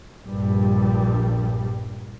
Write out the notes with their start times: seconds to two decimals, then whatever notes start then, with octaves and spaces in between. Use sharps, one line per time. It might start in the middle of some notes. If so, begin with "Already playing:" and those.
0.24 A#1 G2 G3